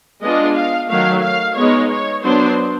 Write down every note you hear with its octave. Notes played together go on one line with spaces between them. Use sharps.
G#3 B3 D4 F4 D#5
F5
D#3 F#3 A3 F5
F5
G#3 B3 D#4 C#5
C#5
F#3 B3 D4 C5